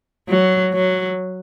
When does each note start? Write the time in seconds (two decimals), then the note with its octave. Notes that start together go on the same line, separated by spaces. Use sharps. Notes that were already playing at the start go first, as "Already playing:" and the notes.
0.29 F#3
0.73 F#3